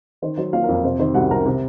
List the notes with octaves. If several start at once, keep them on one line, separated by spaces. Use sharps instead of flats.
D#3 C5
F#3 C5
A#3 F4 F5
A#4
F2
A#4
C3 C5
D#3 C5
C2 F#4 F#5
C2 A#4 A#5
C3